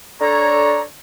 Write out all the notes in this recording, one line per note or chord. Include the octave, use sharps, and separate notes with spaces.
D4 A4 C#5 A#5